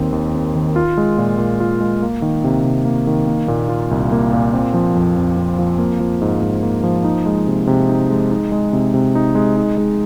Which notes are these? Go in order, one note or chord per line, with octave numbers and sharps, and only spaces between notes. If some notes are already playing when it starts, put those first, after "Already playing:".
Already playing: D#2 D#3 C4
D#2
C4
D#3
F4
G#3
A#2
A#2
F4
G#3
A#3
D#3
C3
C3
A#3
D#3
A#3
A#2
F4
C2
A#3
A#2
C4
F3
F2
F2
C4
F3
A#3
F3
G#2
G#2
A#3
F3
D#4
G#3
C3
C3
D#4
G#3
D#4
G#3
C3
C3
D#4
G#3
D#4
G#3